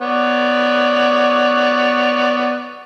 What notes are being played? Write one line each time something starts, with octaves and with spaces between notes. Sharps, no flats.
B3 C#5 D5